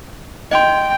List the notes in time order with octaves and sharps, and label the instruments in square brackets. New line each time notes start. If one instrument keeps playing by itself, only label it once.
[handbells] D#5 C6 [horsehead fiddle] G5